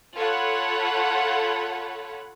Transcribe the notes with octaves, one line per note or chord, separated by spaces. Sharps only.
F4 A4 C#5 F#5 B5